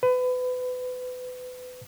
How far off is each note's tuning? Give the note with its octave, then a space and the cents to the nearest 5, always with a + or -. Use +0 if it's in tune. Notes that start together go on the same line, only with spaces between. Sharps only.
B4 +30